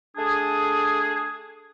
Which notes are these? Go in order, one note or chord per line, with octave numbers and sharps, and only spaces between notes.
A3 D4 G#4